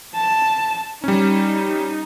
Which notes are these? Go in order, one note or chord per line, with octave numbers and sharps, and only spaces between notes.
A5
G3 C#4 D#4